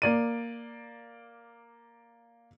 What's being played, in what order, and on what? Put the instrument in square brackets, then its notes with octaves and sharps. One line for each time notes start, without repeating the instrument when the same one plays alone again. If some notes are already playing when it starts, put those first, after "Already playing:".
[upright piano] A#3 D5 D#7